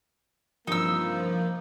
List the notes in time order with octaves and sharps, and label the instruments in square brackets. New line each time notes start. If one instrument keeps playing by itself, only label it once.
[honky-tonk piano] G2 C3 E3 [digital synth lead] F3 [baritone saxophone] A#3 [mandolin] D#4 E6